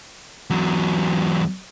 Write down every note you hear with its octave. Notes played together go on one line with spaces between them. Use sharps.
E2 F#3